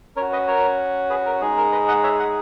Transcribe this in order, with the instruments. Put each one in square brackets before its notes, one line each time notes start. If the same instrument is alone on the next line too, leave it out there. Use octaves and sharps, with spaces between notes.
[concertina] C#4 A#4 C#5
F#4
B4 D#5
A#4 C#5
G#4 B4
A#4
G#3 D#4 G#4
A#4
B4 D#5
D#5 F#5
C#5 E5
D#5 F#5